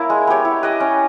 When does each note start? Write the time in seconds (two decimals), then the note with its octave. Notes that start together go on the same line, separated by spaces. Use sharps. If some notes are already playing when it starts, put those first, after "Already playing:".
Already playing: A#3 C#4 E4 A#4
0.10 G#3
0.27 B3 G4 C#5
0.45 E4
0.63 G4 B4 D#5
0.80 C#4